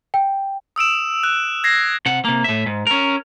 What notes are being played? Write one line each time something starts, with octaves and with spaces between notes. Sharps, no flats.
G5
D#6 E6 D7 E7
F#6
G#6 A#6 C7
C3 F#5
C3 A#3
A2 E5
G#2
C#4 A#4